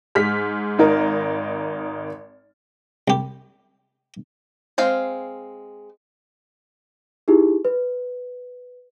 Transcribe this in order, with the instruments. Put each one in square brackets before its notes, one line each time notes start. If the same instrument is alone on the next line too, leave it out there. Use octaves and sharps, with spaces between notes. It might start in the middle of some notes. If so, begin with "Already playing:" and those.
[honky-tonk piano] G#2 F6 B6
G#1 D#4 A#4
[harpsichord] C2 G4
[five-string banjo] G#3 C4 F5
[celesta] D#4 E4 G4 G#4
B4